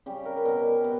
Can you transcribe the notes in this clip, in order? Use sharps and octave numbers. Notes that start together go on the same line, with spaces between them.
C#3 G3 G4
A#4
B4
B2 G3 A#4
B2 B4